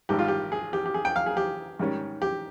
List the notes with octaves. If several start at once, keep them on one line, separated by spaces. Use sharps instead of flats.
G#1 G#2 G3 G4
F4
G4
G#4
G4
G4
G#4
G5
F5
G#4
G4
G#2 D#3 G3 C#4
G4